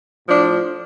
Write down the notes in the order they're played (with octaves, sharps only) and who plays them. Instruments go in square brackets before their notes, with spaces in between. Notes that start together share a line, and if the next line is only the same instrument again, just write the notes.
[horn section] A2 F3 D4